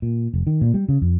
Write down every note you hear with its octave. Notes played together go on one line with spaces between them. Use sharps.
A#2
F1
D#3
A#2
G3
C#3
F2